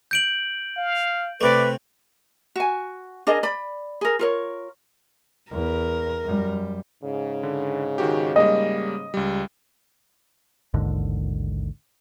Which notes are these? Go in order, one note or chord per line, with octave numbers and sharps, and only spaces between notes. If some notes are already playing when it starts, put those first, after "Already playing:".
G6 D7 F#7
F5
C3 A3 B4 D5
F#4 G#5
D4 G#4 A#4 D#5
D5 B5
G#4 A#4
F4 A#4 C#5
E2 A#4
F#2 G3
G#2 C#3
D3
D#3 F#4 G4
G3 G#3 A#3 D#5
C#2 G3
A1 D#2 G#2 D3